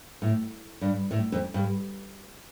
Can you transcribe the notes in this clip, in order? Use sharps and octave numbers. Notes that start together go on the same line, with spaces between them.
A2
G2
A2
F2
G2